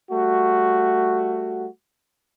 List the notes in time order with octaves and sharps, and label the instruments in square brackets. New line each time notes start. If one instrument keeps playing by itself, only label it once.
[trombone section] G3 A3 F#4